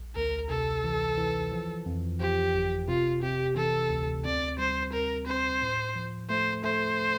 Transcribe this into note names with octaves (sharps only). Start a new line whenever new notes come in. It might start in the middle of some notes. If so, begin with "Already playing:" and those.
Already playing: A#1
D2 A#4
C3 A4
E3
E3
F3
F2
F3 G4
G1
C3 F4
C3 G4
E3 A4
D2
C4 D5
G3 C5
C4 A#4
C4 C5
A2
F3
A3 C5
A3 C5